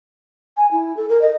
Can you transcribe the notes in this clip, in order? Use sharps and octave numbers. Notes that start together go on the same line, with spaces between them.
G#5
E4
A4
A#4
D#5